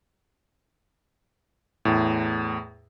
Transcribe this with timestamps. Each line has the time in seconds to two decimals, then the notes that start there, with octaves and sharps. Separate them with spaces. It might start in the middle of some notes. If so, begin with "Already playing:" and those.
1.85 E2 A2